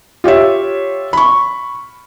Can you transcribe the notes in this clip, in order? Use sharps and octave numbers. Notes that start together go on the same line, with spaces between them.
F4 G4 C#5 E5
B5 C#6